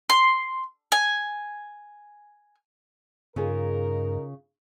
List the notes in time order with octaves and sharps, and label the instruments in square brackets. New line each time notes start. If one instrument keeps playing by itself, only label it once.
[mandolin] C6
G#5
[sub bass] G2 [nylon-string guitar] C#3 F4 G#4 [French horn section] D#4 A#4